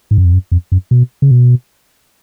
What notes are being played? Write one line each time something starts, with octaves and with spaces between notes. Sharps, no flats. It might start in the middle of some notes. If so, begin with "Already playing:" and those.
G#2
F#2
F2
F#2
F2
F#2
B2
C#3
B2